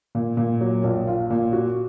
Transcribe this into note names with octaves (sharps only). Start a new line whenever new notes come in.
A#2
A#2
F#3
A#1
F4
A#2
F#4